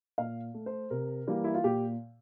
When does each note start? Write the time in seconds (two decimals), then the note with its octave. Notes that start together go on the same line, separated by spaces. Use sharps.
0.18 A#2 F5
0.54 A3
0.66 C5
0.90 C3 A#4
1.28 E3 G3 A#3
1.44 E4
1.54 F4
1.64 A#2 G4